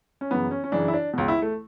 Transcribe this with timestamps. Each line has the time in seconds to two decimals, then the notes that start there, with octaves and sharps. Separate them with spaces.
0.21 C#4
0.30 F#2 C#3 E3 B3
0.51 C#4
0.64 C#4
0.72 F#2 C#3 E3 D4
0.88 E4
0.93 D4
1.13 C#2 B2
1.28 E4
1.42 A3